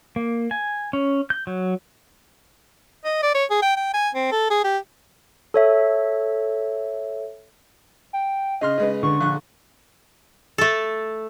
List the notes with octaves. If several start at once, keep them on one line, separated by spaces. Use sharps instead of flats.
A#3
G#5
C#4
G6
F#3
D#5
D5
C#5
G#4
G5
G5
G#5
C4
A4
G#4
G4
A4 C#5 E5
G5
C#3 D#5 C6 F6
C#3 G#3 B4
D3 C#6
A#1 F#6
A3 A4